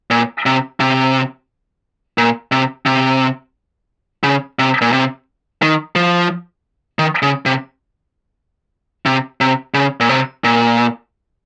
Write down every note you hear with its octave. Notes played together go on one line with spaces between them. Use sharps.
A#2
C3
C3
A#2
C3
C3
C#3
C3
A#2
C3
D#3
F3
D#3
C#3
C3
C3
C3
C#3
A#2
C3
A#2